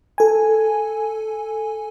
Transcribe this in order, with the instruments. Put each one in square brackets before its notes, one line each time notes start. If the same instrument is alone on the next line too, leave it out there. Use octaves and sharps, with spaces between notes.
[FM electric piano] A4 G#5